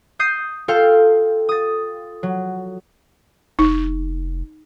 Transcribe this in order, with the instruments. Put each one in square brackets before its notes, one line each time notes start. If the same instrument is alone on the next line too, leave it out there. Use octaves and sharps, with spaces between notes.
[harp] D#6 G6 C7 D#7
F4 A4 F5 G5 F6
D#6 A6
F#3
[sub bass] F1 [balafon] D#4